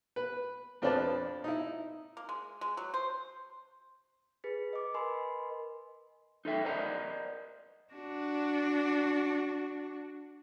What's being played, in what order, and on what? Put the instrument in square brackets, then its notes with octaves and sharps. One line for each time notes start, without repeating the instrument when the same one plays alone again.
[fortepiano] B4
F2 F3 D4 B4 D5 A5
D#4 E4
[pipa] A#3
G#3
G#3
F#3
C5
[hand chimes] G#4 B4 A6 B6
D#5 D6
A#4 B4 D#5 G#5 B5 C6
[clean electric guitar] D#4 A4 E5 G5
A#4 C5 D5 D#5 F#5 A#5
[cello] D4 F#4